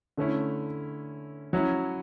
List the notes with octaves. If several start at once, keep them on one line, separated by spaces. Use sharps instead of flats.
D3 A3 C#4 E4
F#3 C#4 E4